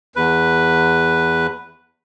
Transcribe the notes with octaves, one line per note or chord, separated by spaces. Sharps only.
E2 B4